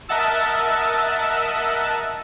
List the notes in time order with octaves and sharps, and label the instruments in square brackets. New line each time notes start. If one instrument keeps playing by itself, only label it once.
[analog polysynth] A#4 D#5 E5 F#5 A5 E6